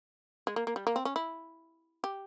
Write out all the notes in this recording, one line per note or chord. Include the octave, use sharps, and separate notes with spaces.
G#3
A#3
A#3
G3
A#3
C4
C#4
E4
G4